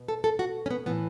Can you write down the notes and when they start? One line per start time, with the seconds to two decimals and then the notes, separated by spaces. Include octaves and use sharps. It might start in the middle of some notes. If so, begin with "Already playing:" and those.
Already playing: B2
0.08 A4
0.24 A4
0.39 F#4
0.66 C#4
0.70 B3
0.86 A2 E3 B3